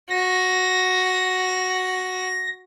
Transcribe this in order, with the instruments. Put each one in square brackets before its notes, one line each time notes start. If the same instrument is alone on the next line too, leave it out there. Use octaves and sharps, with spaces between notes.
[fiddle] F#4 [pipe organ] A#6